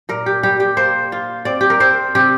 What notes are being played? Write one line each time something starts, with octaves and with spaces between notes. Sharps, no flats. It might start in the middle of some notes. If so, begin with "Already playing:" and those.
A#2 A#4
G4
G3 G4
G4
A#3 C5
F4
C4 D5
G4
A#4
C4 C5
C3 G4